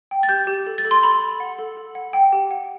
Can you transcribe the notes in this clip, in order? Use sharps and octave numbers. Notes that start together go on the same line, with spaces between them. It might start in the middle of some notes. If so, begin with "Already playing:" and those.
G5
A6
G4 G6
G4
A4
A6
A4
C6
A4 B5
A4
F#5
A4
A4
F#5
F#5 G5
G4
F#5